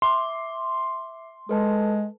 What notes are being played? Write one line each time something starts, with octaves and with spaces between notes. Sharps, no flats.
E5 C6 D6
G#3 A4 B4 A5